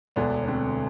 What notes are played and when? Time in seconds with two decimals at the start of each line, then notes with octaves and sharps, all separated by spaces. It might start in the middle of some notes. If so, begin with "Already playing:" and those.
0.16 E1 D2 D3 B3 D4
0.44 D4
0.48 A3 C4